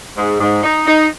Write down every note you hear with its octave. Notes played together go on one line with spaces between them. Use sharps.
G#2
G#2
D#4
D#4